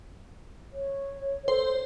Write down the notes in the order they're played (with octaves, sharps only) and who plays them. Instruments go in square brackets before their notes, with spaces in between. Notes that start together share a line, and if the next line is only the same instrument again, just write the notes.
[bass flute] C#5
[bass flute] A4 [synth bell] C5